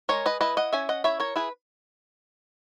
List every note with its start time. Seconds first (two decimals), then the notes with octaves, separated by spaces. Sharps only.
0.09 G#3 A#4 C#5
0.26 B4 D#5
0.41 E4 B4 D#5
0.57 D#5 F#5
0.73 C#4 E5 G#5
0.89 D#5 F#5
1.04 E4 C#5 E5
1.20 A#4 C#5
1.36 E4 G#4 B4